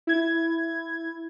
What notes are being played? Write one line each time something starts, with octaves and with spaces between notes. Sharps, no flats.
E4 G#6